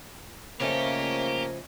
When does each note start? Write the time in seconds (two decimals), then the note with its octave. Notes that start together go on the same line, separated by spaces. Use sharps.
0.60 C#3 F3 A3 A#3 C#4 G4 D#5